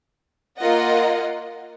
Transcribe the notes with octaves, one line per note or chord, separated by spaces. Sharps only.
A#3 F4 A#4 D#5 F#5